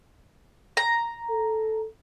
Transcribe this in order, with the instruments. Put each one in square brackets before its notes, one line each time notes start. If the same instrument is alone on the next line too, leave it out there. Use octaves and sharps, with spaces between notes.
[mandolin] A#5
[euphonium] A4